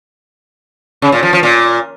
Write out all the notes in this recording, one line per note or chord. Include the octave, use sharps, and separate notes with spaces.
C#3
A#2
F3
F3
A#2